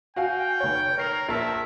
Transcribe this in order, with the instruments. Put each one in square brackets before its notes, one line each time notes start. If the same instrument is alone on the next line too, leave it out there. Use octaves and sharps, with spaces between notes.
[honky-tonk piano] F#4 F5 G#5 [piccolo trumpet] G5
[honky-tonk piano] F1 C#5
[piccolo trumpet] A#4 [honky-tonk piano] C#5 C7 F7
[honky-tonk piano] A#1 A#4 A5 [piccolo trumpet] E5